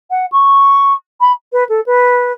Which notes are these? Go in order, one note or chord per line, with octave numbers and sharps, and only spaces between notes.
F#5
C#6
B5
B4
A4
B4